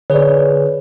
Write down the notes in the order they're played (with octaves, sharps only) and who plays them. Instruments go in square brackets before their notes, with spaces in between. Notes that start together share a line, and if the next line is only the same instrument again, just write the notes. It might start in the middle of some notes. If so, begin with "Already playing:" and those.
[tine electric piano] D3 G#4 B4 [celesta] C#5 D5